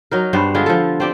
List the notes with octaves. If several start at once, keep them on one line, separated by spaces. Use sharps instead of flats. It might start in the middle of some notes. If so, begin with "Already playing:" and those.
F#3 D#4 A#4
G2 B3 D4 C5
D3 G#3 F4 G#4
F3 A4
C4 G4 D5